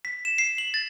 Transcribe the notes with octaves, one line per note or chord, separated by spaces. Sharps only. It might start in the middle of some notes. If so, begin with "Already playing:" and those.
B6
E7
C7
F#7
A6